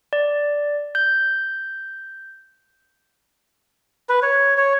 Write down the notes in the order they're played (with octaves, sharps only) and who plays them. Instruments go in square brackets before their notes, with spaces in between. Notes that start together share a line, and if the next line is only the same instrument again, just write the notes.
[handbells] D5
G6
[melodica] B4
C#5
C#5